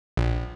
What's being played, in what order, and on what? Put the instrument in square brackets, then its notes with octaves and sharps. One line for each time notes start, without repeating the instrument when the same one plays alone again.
[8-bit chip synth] A#1